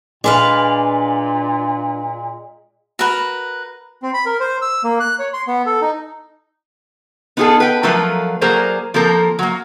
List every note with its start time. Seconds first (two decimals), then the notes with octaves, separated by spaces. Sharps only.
0.24 A#2 G#3 D4 B4 F5
2.99 F#4 A#4 B4
4.02 C4
4.14 B5
4.26 A#4
4.40 C5
4.62 E6
4.84 A#3
5.00 F#6
5.19 C#5
5.33 C6
5.48 B3
5.66 A4
5.82 D#4
7.37 B3 D#4 F4 F#4 G#4 A4
7.60 B4 G5
7.83 F3 F#3 A3 F4 A#4 B4
8.41 F#3 A#3 G#4 A#4 C5 D5
8.94 F3 A#3 C4 A4 A#4
9.39 F#3 A#3